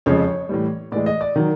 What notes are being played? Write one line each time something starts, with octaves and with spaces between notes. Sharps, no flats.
F2 C#3 F3 G#3 C#5
C#5
A2 E3 G3
A2 E3 G#3 D5
D#5
D5
D#3 F#3